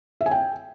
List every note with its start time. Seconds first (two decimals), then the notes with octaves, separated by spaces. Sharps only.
0.21 E5
0.26 G#5
0.31 G5